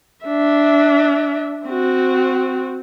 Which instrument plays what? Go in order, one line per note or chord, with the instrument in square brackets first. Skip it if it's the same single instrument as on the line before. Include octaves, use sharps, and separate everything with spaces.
[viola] D4 E5
C4 F#4